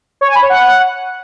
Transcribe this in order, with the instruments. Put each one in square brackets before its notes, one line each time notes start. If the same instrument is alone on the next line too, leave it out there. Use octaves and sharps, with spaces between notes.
[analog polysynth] C#5
G#5
B5
C#5
F#5